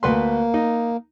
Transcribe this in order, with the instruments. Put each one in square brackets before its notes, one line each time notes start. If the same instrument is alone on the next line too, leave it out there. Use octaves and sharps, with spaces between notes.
[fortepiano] D2 B4 C6 [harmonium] A#3
[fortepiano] D#4